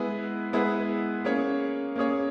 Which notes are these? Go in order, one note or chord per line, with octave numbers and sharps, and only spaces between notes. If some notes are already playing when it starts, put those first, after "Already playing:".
Already playing: G#3 B3 E4 G#4 B4
G#3 B3 E4 G#4 B4
A#3 C#4 G#4 C#5
A#3 C#4 G#4 C#5